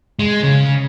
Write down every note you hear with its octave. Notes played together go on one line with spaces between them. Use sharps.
G#3
C#3